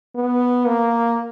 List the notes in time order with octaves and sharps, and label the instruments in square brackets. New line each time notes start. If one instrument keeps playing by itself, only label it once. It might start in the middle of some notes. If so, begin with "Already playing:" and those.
[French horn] B3
A#3